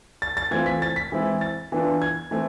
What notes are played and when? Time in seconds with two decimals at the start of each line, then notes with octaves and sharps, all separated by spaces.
0.22 A6
0.37 A6
0.51 E3 A3 C4 F4 G#6
0.66 B6
0.82 A6
0.96 B6
1.12 E3 G#3 C4 E4
1.41 A6
1.72 E3 B3 D4 F4
2.02 G#6
2.31 E3 A3 C4